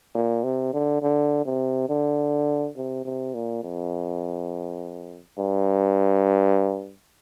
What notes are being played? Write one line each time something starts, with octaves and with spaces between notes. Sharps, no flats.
A#2
C3
D3
D3
C3
D3
C3
C3
A#2
F2
G2